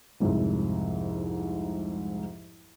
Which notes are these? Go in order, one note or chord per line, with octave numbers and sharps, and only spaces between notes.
C2 F2 G#2 F3